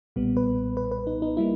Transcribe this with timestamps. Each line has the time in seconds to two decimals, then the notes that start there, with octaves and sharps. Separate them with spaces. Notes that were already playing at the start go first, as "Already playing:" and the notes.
0.16 B1 A#2 G3 B3
0.37 B4
0.77 B4
0.91 B4
1.07 D#4
1.22 D#4
1.37 G3 A#3 E4